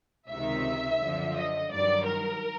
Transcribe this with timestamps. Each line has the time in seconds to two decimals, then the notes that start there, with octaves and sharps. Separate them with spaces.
0.28 C#2 C3 D#3 E5
0.99 F#2 D3 F3
1.34 D#5
1.71 G2 D#3 F#3 D5
2.06 A#4